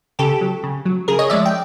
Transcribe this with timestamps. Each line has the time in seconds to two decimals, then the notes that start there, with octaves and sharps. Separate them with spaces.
0.19 C#3 G4 A4
0.41 F#3
0.63 C#3
0.85 F#3
1.08 C#3 G#4 A#4
1.19 C#5 D#5
1.30 F3 G#3 D5 E5
1.46 G5